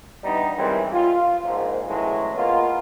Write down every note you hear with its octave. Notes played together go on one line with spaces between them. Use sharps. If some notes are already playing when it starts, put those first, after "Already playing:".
E3 G3 B3 D4 D#4
D#3 E3 G3 G#3 C4 C#4
F4
A#1 G#2
A2 C#3 E3 F#3 G#3 A3
G#3 A#3 B3 F4